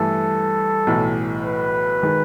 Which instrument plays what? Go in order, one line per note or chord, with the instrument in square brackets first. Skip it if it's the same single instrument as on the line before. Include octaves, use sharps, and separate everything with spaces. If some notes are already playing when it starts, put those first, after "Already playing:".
Already playing: [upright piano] G2 E3 A3 [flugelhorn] A4
[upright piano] B1 A2 E3
[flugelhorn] B4
[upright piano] D#3 G#3